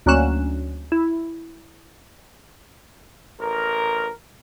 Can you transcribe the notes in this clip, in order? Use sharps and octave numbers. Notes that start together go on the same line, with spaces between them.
D2 F#3 A#3 C#4 F#6 E7
E4
A1 A#4